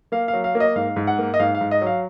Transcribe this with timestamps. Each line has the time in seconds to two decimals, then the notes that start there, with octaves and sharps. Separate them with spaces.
0.12 A#3 F5
0.28 F5
0.33 F#3
0.44 F5
0.55 A#3
0.60 D#5
0.76 G#2 F5
0.96 G#2
1.07 F#5
1.18 A#3
1.34 D#5
1.40 G#2 F5
1.55 F5
1.61 G#2
1.71 D#5
1.81 F#3
1.86 F5